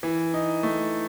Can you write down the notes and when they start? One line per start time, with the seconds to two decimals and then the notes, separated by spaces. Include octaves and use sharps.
0.03 E3
0.34 D#4
0.63 A3